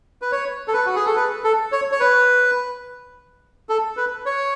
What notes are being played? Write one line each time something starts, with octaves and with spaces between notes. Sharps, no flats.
B4
C#5
A4
B4
F#4
G#4
A4
B4
A4
C#5
C#5
B4
A4
B4
C#5